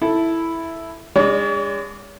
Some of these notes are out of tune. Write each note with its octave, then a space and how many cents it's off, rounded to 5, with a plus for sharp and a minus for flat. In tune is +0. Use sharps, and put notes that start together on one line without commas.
E4 +0 A4 +0
G#3 -40 D4 -25 C#5 +45